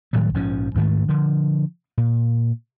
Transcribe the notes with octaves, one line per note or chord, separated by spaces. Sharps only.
A2 D#3 F#3 G3
A#1 G#2 F3 C#4
D2 G#2 D#3 A3
D3 F3
A#2